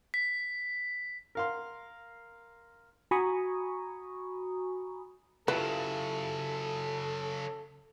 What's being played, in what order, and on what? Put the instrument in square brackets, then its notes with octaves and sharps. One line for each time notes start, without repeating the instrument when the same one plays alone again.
[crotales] B6
[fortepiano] A#4 F5 C6
[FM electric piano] F#4 G#5 A#5 B5 C#6 D#6
[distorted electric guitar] C#3 F#3 [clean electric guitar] E4 F4 G4 [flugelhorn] A4 [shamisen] B4